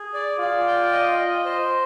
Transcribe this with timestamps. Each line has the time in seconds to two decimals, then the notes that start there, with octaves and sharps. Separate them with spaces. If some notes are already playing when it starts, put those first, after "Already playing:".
Already playing: G#4
0.14 D5
0.39 F4 D5
0.67 G5
0.93 D#5
1.19 D#5
1.45 C5